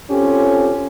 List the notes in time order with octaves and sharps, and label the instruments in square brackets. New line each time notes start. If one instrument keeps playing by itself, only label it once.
[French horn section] C4 C#4 F4 G4 A4